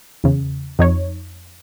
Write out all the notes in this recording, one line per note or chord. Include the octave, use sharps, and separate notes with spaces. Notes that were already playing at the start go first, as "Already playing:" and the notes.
E2 C#3
F2 D#4 C#5